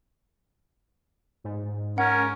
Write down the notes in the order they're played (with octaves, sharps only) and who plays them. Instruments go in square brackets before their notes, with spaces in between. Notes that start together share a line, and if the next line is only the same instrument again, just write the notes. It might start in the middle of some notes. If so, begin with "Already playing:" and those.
[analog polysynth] G#2
[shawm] C#4 [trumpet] A#4 [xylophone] F#5